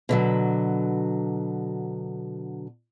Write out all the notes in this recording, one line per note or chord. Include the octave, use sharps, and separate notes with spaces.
B2 D3 F#3